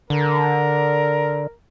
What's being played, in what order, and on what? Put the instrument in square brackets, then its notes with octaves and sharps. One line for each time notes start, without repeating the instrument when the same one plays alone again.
[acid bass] D3 [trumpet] A#4